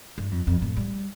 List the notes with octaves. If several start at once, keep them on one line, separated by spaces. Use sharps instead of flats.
G2
F2
F2
A2
G3